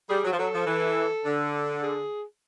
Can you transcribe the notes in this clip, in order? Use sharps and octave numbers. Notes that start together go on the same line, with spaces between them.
G3 G#4
F#3
F3
F#3 A4
F3
E3
D3
G#4